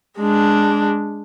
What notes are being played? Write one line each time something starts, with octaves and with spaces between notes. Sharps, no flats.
G#3 D4